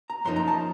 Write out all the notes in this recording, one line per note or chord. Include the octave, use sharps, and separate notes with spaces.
A#5
F#2 F3 A#3 D#4 C6
A#5
A5